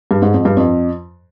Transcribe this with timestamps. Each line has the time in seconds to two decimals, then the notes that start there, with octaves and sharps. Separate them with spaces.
0.11 G2
0.22 G#2
0.34 F2
0.45 G2
0.57 F2